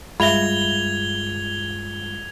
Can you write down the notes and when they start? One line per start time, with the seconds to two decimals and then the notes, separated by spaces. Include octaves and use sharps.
0.20 G2 G#3 F4 E5 B5 G#6 F7 G7